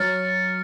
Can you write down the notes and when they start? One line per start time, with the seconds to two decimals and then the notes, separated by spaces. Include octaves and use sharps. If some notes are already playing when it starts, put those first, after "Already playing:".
Already playing: F#3 F6 A6 C#7